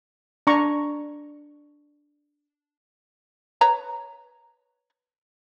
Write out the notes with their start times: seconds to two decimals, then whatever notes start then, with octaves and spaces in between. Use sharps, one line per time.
0.47 D4 A#5 C#6
3.61 B4 C#5 A#5